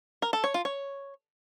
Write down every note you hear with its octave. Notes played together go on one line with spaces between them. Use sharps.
A#4
A4
C#5
F4
C#5